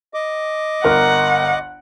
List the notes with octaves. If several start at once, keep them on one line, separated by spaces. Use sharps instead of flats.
D#5 D6
G1 A#4 F#5 A#5